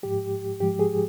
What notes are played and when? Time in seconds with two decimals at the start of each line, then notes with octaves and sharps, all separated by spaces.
0.03 G#2 F3 G#3 G4
0.60 G#2 F3 G#3 G4
0.79 G#4